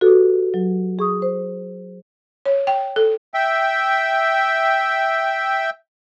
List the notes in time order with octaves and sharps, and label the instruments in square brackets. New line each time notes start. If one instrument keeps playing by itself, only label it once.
[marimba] F#4 G4 A4 B4
F#3
G#4 C#6 D#6
C5
[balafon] C#5
G5
A4
[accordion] E5 G5